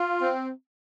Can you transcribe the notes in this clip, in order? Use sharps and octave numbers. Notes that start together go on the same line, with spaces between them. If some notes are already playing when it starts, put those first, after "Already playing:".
Already playing: F4
C4